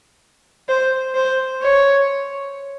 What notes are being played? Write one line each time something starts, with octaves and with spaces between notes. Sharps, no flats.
C5
C5
C#5